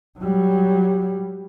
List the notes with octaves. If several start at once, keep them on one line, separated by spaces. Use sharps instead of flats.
F#3 G3